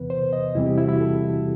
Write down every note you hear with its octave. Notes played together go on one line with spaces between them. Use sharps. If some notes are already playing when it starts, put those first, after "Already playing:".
Already playing: E2 C3 E3 B3 B4
C5
D#5
E2 C3 E3 G3 C4 E4
G4
E4
F#4
E4
A4